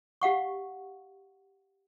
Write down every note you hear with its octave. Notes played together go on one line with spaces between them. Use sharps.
G4 F5 F#5 C#6